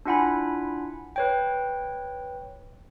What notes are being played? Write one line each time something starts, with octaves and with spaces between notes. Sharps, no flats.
D4 E4 F4 F#5 G#5 B5
B4 C#5 G5